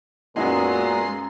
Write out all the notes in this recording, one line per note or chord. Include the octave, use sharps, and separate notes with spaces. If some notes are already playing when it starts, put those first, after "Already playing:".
F#2 A#2 F#3 G#3 B3 D#4 C6